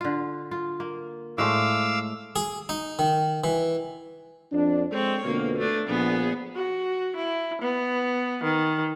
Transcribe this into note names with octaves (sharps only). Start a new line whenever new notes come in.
D3 F4
F4
A#3
A2 G#3 A3 F5 D6 E6
G#4
D#4
D#3
E3
F2 D4
G#3 C4 A4 C#5
F2 B2 D3 A#3
A3 D4
A#1 B3 G#4
F#4
E4
B3
D#3